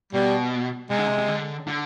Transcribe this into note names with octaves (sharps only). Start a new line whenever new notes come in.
B2 G3
C3 G#3
D3
C3
C3
D3
D3